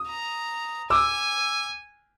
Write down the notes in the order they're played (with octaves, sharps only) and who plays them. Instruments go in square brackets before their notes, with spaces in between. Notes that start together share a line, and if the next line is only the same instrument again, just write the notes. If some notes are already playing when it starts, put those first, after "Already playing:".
Already playing: [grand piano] D#6
[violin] A#5
[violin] G#5 [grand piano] D6 E6